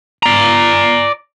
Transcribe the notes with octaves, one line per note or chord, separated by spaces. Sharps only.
D5 A#5